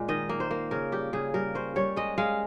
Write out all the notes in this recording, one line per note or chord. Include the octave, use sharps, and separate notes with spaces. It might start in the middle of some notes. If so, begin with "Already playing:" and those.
Already playing: A#2 G#3 C4
D#3 D#5
A#3
C5
A#3
C#3 A#4
G3 G4
C#3 G#4
G3 A#4
C#4 C5
G3 C#5
G#3 D#5
G#3 F5